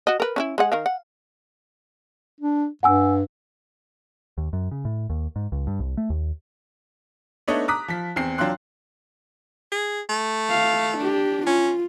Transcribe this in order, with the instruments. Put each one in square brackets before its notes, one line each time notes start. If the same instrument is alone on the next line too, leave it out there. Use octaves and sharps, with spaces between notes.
[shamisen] F#4 D#5
A#4 B4
C#4 D#4 E4
G#3 G#4 F#5
D#3 A#4 F5
F#5
[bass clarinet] D4
[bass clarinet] G2 [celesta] F#5 G#5 E6
[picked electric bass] D#2
F#2
C#3
A2
D#2
G#2
C#2
G2
C2
A3
D#2
[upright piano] A3 B3 D4 D#4 C#5 D#5
A#5 D6 D#6 F#6 B6
F3 B6
E2 C4 G5 C7
F#3 D4 F4 G5 C6 F#6
[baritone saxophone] G#4
A3
[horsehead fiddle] F5
D4 G4
[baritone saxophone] C#4 [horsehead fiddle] F4